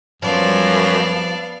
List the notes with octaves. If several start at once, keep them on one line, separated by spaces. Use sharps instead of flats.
F#2 F3 G3 B3 C4 D5 F5 A5